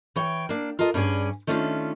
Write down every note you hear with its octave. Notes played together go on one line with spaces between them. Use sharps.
E3 C#5 G5
A#3 D4
F4 A4 A#4 D#5
G2 C#4 G#4 D5 G#5
D#3 A3 C#4 D4 F4